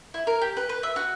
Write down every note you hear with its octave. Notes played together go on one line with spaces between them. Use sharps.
E4
A#4
G4
B4
B4
E5
F#4